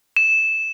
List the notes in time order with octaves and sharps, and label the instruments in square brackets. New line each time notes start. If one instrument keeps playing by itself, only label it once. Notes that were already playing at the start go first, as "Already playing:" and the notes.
[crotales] E7